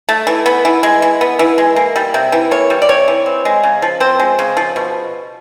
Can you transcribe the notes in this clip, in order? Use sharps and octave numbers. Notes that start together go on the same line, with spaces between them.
A3
E3
B3
E3
G#3
E3
B3
E3
G#3
A#3
G3
C3
E3
A#3 C#5
G3
D5
C3 C#5
E3
C4
G#3
C#3
F3
C4 C5
G#3
C#3
F3
B2